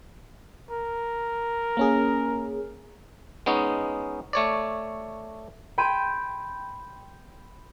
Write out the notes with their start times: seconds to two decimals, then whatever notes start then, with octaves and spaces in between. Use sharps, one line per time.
0.70 A#4
1.77 A#3 C#4 G#4
3.46 G#3 B3 C#4 D#4
4.33 A3 C#5 D5
5.78 G5 B5 C6 G#6 D#7 E7